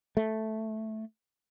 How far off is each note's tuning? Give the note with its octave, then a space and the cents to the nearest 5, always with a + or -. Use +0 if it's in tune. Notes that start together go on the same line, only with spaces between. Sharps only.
A3 -5